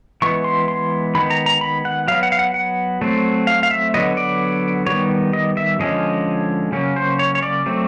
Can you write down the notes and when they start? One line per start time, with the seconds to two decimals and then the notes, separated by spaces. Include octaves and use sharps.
0.22 E3 G#3 B3 C#6
0.44 C6
0.68 C6
1.15 D#3 G#3 B3 B5
1.30 A#5
1.46 A#5
1.61 B5
1.85 F#5
2.08 F#3 B3 F5
2.23 F#5
2.32 F5
2.39 F#5
2.54 F#5
3.02 F#3 A3 C4
3.47 F5
3.63 F5
3.71 E5
3.94 D3 F#3 B3 D#5
4.17 D5
4.86 D#3 G3 B3 C#5
5.33 D#5
5.57 E5
5.79 D3 F3 G#3 C#4 D#5
6.72 C#3 F#3 A#3 C#4
6.96 C5
7.19 C#5
7.35 C#5
7.43 D5
7.66 F#3 A3 C4